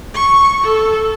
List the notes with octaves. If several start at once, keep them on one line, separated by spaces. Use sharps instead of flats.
C#6
A4